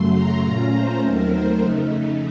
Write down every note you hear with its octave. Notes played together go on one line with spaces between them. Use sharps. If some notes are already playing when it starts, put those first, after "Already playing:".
Already playing: F#2 C#3 F#3 A3 C6
A#5
A#2 A3 C#4 F4
C5
D#2 D#3 F#3 A3 C4 A#4
C5
F2 C#3 A3 D#4